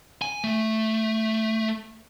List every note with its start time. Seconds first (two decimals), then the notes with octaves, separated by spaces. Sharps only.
0.22 G#5
0.44 A3